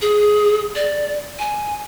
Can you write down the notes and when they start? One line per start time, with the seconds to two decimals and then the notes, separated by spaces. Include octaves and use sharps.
0.02 G#4
0.75 D5
1.39 G#5